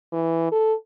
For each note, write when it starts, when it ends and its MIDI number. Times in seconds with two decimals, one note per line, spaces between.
0.13 0.51 52
0.52 0.74 69